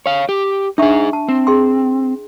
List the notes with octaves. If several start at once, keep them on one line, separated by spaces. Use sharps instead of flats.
C#5 F5
G4
D4 D#4 G#4 E5 C#6
A5
C4
G#4 G5 C6